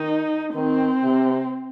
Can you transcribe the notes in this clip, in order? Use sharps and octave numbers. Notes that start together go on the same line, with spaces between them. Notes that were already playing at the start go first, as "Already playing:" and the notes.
Already playing: D#3 D#4
D#3 C4
C3